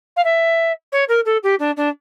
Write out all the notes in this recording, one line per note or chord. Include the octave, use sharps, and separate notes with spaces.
F5
E5
C#5
A#4
A4
G4
D4
D4